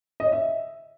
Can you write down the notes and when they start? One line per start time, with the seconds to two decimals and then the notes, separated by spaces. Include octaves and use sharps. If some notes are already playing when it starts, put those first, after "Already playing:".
0.20 D#5
0.26 C#5
0.32 E5